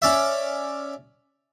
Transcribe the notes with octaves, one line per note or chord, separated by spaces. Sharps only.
C#4 D5 E5